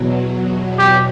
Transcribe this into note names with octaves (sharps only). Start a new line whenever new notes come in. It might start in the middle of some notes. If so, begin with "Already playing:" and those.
Already playing: E2 B2 F#3
G4